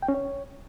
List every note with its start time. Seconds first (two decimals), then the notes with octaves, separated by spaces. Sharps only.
0.02 G5
0.08 C#4
0.14 C#5